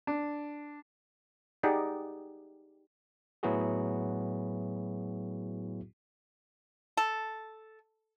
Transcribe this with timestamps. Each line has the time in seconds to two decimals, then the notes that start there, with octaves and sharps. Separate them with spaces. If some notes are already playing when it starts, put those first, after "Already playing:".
0.07 D4
1.63 D#4 G4 G#4 D5 F#5 G5
3.43 A2 F#3 B3 E4 F#4 G#4
6.97 A4